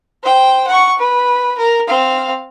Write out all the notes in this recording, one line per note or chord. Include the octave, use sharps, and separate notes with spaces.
C5 G5
F#5 C#6
B4
A#4
C4 F5